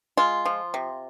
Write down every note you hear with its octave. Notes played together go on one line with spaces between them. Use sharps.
G#3 F4
F3
C3